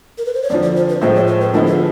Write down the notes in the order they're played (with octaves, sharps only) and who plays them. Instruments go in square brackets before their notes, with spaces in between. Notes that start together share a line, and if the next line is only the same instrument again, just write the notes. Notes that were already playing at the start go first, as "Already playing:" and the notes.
[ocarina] A#4
B4
C5
C#5
[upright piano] F2 D3 F3 [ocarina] D5
[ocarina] D5
C5
B4
[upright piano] A2 F3 G#3 C4 [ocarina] C5
[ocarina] C#5
C5
B4
[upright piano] D3 F3 G#3 B3 E4 [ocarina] A#4
[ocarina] B4